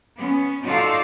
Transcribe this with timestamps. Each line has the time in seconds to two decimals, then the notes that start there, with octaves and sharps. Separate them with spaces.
0.15 B3 C#4
0.64 D#4 F4 F#4 A4 D5 F5